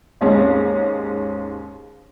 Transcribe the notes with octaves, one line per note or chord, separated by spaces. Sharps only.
D#2 G#2 G#3 C#4